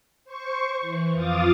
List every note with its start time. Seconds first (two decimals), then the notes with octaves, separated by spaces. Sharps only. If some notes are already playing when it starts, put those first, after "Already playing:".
0.25 C5 C#6
0.81 E3
1.13 F2 F4 F5 D6 D#6 A6